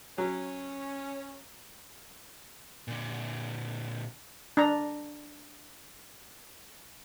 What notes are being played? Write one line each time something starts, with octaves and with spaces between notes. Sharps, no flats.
F#3 C#4
A#2 D3
D4 A#5